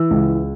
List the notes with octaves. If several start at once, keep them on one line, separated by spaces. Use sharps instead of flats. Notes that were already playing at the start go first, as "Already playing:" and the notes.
Already playing: E3 E6
C#2